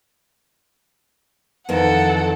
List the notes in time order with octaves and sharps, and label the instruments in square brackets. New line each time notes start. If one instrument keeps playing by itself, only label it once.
[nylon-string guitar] F2 D#3 E3 [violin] A4 F#5